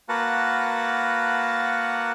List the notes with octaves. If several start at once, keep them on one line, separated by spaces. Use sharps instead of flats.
A#3 F#4 A#4 B4 F#5 A5